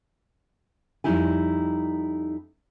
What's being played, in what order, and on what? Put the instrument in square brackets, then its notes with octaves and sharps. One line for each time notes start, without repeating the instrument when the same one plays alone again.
[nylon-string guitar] F2 G3 A#3 D#4 E4 G#5